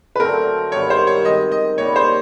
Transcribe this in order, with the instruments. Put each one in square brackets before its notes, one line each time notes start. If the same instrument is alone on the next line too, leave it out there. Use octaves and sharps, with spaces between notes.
[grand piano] B4
[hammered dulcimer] D3 F#3 A3 C4 [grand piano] A#4
[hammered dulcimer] G2 D#3 F#3 B3 [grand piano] C#5
[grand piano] C5
C#5
[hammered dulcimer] D#3 G#3 C4 [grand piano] D#5
[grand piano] D#5
[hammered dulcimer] A#2 G3 B3 [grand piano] C#5
[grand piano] C5